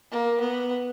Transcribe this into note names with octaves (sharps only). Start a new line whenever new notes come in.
A#3
B3